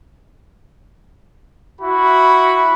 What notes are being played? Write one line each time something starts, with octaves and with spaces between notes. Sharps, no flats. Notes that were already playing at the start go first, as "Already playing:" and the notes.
E4 F#4 B5